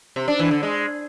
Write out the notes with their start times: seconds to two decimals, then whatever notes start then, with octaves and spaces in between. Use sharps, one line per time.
0.16 C3
0.28 D4
0.39 E3
0.51 D3
0.63 G#3